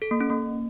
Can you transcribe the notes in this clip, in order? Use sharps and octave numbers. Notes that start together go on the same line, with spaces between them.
A4
A#3
C#4
A#3